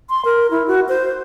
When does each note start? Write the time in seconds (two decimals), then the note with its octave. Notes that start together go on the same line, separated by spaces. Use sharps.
0.10 C6
0.25 A#4
0.51 E4
0.68 F#4
0.89 C5